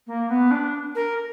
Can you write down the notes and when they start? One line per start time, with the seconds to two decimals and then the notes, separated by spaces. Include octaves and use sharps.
0.07 A#3
0.29 B3
0.51 D4
0.95 A#4